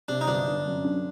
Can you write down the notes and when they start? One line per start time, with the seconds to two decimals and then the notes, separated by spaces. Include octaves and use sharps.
0.08 C3 D4
0.21 D#4
0.27 G1 D4
0.47 G1
0.66 F#2
0.85 D3